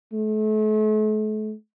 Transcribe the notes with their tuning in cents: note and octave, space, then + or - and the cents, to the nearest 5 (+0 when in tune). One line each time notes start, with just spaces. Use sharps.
A3 -40